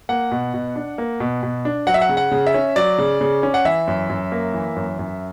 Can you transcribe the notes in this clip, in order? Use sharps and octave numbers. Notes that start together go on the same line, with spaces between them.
A#3 F#5
B2
B2
D4
A#3
B2
B2
D4
F#3 F#5
E5
F#5
C#3
F#5
C#3
E5
C#4
F#3 D5
C#3
C#3
C#4
F#5
E3 E5
F#2
F#2
A#3
E3
F#2
F#2